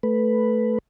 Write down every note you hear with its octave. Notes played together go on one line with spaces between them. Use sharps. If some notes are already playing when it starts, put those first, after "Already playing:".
A3 B4